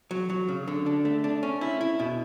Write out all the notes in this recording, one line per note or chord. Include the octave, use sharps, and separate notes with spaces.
F#3
F#3
C#3
D3
D4
A3
D4
C#4
E4
E4
B2